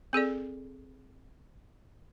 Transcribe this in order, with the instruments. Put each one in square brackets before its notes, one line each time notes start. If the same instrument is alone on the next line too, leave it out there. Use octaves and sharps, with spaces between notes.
[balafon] C4 G#4 A4 D5